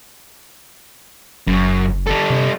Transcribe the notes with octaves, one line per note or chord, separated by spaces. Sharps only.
F#1 F#2
G3 A4
C3